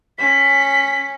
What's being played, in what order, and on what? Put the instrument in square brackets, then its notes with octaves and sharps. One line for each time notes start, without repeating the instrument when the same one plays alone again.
[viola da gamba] C#4 [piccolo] B6